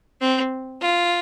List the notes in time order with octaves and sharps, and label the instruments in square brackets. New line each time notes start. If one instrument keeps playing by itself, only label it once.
[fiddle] C4
F4